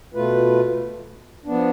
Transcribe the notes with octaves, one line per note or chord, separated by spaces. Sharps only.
B2 A3 F4 B4
F3 B3 D4